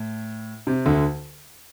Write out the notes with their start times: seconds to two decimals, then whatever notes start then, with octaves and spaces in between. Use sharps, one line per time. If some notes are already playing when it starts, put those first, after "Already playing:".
Already playing: A2
0.67 C3
0.85 D2 D3